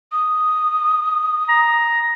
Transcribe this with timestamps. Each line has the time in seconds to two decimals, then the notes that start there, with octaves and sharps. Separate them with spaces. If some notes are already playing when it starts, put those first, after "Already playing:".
0.12 D#6
1.49 A#5